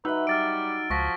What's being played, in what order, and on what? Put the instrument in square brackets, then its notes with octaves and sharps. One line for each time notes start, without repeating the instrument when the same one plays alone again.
[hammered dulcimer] F#3 E5 [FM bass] D#4 [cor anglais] B4 [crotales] E6
[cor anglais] G3 [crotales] F6 A6 D7
[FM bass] C#2 [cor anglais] F3 [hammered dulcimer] F#5 [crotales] C#6 A#6 B6